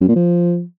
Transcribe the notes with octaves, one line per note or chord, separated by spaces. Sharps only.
F#2
A#2
F3